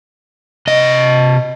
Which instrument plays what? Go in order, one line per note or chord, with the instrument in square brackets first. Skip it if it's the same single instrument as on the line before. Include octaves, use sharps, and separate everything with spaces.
[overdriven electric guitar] C3 D#5